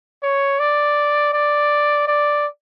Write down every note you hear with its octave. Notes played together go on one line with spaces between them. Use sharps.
C#5
D5
D5
D5